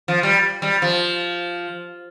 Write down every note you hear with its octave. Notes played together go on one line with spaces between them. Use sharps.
F3
G3
G3
F3